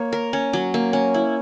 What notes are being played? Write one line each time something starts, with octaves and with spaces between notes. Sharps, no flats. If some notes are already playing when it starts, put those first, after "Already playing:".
Already playing: A#3 C#5
A#4
C#4
F#3
A#3
C#4
E4